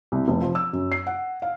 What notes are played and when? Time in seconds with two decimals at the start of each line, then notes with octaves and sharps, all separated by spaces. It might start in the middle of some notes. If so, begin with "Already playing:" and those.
0.12 C2
0.28 F1
0.41 F3
0.55 E6
0.73 F#2
0.92 C7
1.07 F#5
1.42 F5